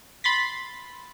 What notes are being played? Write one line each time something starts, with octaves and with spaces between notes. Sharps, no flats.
B5 C6 A6 B6